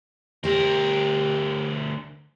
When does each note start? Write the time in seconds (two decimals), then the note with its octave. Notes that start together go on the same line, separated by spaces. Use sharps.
0.44 D2 G4 A#4 C5